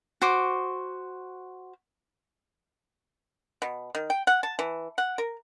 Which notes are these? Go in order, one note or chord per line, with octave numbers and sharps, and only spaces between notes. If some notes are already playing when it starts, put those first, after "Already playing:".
F#4 C5 D6
B2
D#3
G5
F#5
A5
E3
F#5
A#4